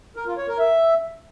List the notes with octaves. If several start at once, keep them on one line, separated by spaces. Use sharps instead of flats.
A#4
F4
C#5
A#4
E5